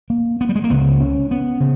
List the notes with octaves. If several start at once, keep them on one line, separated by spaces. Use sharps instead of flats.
A#3
B3
G3
G#3
A#3
C#2 C#3 B3
C#4
B3
C#3